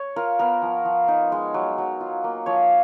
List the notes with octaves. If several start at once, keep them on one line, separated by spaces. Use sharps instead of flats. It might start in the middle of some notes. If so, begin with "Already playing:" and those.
Already playing: C#5
F4 A#4
B3 A#4
F3
F3
D#4
G#3
F#3
F#3
F4
A#3
F3 C#5